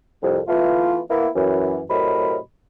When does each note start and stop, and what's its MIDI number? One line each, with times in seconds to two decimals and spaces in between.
0.23 0.39 36
0.23 0.39 41
0.48 0.99 52
0.48 0.99 57
0.48 0.99 59
0.48 0.99 65
1.10 1.28 58
1.10 1.28 59
1.10 1.28 64
1.35 1.82 42
1.35 1.82 52
1.90 2.37 45
1.90 2.37 48
1.90 2.37 54
1.90 2.37 70
1.90 2.37 75
1.90 2.37 83